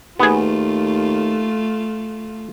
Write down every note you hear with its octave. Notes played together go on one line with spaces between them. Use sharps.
D#2 A3 B3 F4 G#4